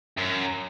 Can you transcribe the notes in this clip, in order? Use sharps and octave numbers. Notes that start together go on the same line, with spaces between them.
F#2